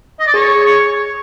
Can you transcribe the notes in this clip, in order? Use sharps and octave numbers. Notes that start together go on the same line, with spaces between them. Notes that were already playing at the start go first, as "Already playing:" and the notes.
D#5
D5
G#4 C#5
C#5